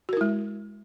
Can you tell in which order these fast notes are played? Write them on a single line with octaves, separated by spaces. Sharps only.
F#4 A#4 E4 G#3